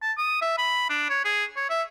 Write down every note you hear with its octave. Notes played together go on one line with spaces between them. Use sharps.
A5
D#6
E5
B5
D4
C#5
G#4
C#5
E5